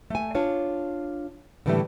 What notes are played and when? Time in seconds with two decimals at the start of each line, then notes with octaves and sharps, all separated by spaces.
0.10 A3 G#5
0.35 D4 F4 C#5
1.66 A2 D3 E3 F#3 G3 A3